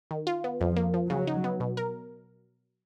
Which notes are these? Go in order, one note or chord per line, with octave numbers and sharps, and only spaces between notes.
D#3
F4
B3
F2 F3
A#3
F3
C#3 F#3
D#4
B3
B2
A#4